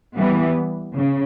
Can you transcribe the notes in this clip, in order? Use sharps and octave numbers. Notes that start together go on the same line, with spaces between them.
E3 G3 B3
C#3